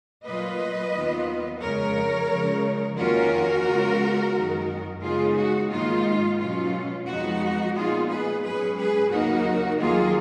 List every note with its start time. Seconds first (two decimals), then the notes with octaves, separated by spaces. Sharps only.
0.24 A#2 F#3 A#3 F4 B4 D#5
0.93 D#2 D#3 F#3 B3 F4
1.60 F2 C#3 G#3 A#4 C#5
2.29 C#3 F3 G#3
2.97 F2 D#3 A#3 C#4 F4 F#4 A#4
3.65 C#3 G#3 B3 F4
4.34 F#2 D#3 G#3
5.02 C#3 G#3 B3 D#4 F4 G#4
5.36 F#4
5.70 G#2 D#3 A#3 D#4 F4
6.39 B2 F#3 C#4 F4
7.07 F2 F3 G#3 B3 D#4 F#4
7.75 A#2 G#3 B3 D#4 F4 G#4
8.09 G#4 B4
8.43 G#2 F#3 C#4 G#4 B4
8.77 G#4 B4
9.11 D#2 C#3 F#3 A#3 D#4 F#4 A#4
9.79 D#2 D#3 F#3 A#3 F4 G#4